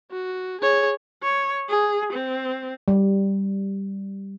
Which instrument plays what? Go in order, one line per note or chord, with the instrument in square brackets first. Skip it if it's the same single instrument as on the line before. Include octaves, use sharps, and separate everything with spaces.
[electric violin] F#4
G#4 C#5
[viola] C#5
G#4
C4
[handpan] G3